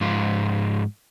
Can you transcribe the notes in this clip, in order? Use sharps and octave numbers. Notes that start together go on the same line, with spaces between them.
G#2 F3 F4